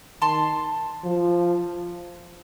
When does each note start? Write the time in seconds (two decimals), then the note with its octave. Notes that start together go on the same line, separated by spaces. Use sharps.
0.21 D#3 A5 C6
1.05 F3